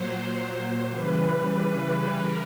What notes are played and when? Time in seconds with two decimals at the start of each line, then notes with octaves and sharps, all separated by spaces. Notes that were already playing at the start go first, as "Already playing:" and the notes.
Already playing: A#2 F#3 C5
0.90 C#3 E3 G3 B4
2.15 A#4